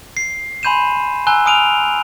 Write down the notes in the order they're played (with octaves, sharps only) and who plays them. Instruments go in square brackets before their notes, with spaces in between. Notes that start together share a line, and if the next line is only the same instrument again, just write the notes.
[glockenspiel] C7
G#5 B5 C6 G6 D#7 E7
G#5 A#5 E6 F#6 G7
G#5 D#6 F6 D7 D#7 F7